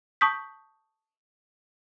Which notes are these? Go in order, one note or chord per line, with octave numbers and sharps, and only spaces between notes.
A5 C#6 D#6 G6 B6